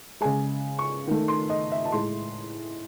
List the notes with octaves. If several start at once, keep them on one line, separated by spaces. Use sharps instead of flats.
C#3 G#3 G#5
C#6
D#3 A3
C6
D#5
E5
A5
A2 G#3 C6